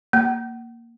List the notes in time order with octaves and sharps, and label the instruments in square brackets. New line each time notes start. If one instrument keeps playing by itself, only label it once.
[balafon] A#3